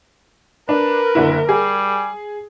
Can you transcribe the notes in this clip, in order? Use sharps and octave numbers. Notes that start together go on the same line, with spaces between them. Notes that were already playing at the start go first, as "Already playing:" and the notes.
D4 A#4 B4
F#1 D3 E4
G3 G#4